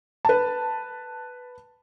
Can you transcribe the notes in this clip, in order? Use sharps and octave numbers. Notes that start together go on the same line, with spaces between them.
B4 A5